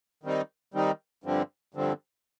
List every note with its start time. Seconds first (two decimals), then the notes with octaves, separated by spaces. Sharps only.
0.23 D#3 G3 C4 D#4
0.74 D#3 G3 C4 D#4
1.24 G2 D3 F3 C4
1.74 G2 D3 F3 C4